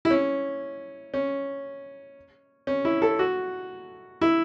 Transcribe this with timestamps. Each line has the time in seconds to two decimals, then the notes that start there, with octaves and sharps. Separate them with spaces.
0.05 E4
0.11 C#4
1.14 C#4
2.67 C#4
2.85 E4
3.02 A4
3.19 F#4
4.21 E4